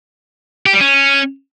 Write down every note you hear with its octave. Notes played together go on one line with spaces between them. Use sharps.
G4
G3
C#4